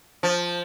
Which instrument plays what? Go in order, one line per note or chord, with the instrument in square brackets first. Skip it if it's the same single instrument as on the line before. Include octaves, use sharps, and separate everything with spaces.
[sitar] F3